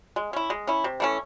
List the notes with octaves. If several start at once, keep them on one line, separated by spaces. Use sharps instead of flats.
G#3
C#4 E4
G#3
C#4 E4
C3
E3 A3 C#4